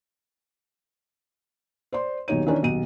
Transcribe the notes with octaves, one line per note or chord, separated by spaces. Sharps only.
C5 D5 C6
D#1 B1 D#4 C#5 D#7
D#3 E3 C#4 D4 E4
D#1 B1 D#7